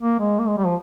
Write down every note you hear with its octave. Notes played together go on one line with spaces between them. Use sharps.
A#3
G#3
A#3
G#3
G3
F3